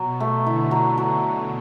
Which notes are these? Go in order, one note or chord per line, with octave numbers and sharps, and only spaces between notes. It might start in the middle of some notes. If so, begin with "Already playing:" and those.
Already playing: B2 F#3
A3
D3 E4
F#3
F#3